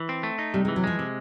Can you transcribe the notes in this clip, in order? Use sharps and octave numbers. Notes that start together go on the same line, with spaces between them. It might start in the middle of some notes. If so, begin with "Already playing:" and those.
Already playing: E3
C4
A3
D#4
C3 G3
G#3
E3
F#3
F3 G#3
C3 F3